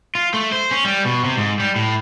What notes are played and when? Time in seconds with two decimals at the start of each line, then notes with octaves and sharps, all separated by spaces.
0.15 F4
0.34 A3
0.52 C5
0.71 C#4
0.85 G3
1.05 B2
1.24 C3
1.37 G#2
1.60 G3
1.76 A2